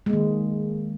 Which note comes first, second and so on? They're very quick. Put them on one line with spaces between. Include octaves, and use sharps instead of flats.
G#3 A#3 D#3